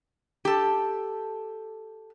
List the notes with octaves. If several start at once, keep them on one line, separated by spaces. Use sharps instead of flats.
G4 A4